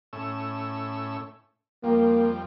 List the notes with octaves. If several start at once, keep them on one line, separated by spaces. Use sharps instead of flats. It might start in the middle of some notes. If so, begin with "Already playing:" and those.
A2 C#4 E6
F2 G3 A#3